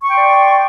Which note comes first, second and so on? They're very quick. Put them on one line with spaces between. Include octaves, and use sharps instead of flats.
C#6 G5 C6 D5